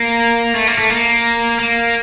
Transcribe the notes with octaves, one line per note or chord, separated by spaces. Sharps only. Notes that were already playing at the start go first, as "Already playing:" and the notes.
Already playing: A#3
A3
A#3
A3
A#3
A#3